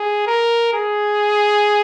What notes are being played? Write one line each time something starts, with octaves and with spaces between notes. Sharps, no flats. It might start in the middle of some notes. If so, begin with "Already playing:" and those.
Already playing: G#4
A#4
G#4